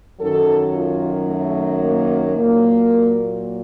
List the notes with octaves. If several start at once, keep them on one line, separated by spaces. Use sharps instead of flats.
F#2 D#3 F#3 A4
F4
A3
A#3
A#2 F#3 A#3